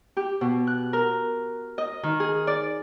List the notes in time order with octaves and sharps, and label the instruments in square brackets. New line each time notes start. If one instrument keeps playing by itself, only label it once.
[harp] G4
B2
F#6
A#4
D#5
D#3
G#4
D5